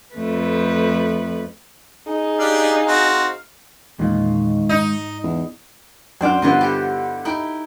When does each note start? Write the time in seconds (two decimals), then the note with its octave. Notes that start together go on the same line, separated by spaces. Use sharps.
0.14 F2 A3 B4
2.07 D#4 G#4
2.39 D4 G4 D5 F5
2.87 C4 F#4
3.99 E2 A#2 D#3 G#3 F5
4.69 G#2 D#4
5.23 E2
6.21 F#2 D4 C5 G5 D6 F6
6.42 G2 D3 B3 E4 F4 D#5
6.61 G4 A4
7.25 D#4 E4 G5